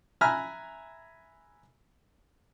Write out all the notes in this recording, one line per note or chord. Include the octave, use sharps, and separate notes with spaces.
E5 G#5 A#5 B5 F6 F#6